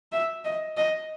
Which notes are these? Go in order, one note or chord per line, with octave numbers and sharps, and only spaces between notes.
E5
D#5
D#5